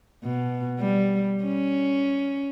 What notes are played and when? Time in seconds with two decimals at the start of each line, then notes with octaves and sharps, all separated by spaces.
0.23 B2
0.79 G3
1.44 C#4